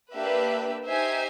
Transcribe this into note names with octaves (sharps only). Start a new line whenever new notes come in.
A#3 D4 G4 B4 E5
D#4 G4 C5 E5 G#5